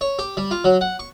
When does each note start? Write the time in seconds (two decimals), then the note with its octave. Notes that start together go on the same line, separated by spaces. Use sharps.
0.01 C#5
0.19 G4
0.37 G3
0.51 F4
0.64 F#3
0.81 F#5
0.99 C#6